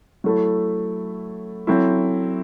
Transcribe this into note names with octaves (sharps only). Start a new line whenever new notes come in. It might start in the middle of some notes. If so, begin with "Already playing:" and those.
F#3 A3 E4 A4
F#3 C4 E4 A4